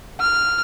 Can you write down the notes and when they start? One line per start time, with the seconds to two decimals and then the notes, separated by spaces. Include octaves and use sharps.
0.20 F6